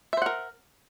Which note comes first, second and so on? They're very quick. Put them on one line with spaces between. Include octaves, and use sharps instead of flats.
E5 C5 F#5 A#4